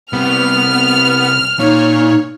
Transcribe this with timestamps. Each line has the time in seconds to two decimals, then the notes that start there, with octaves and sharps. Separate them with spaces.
0.13 C3 G3 B3 F6
1.59 A#2 D#4 C#5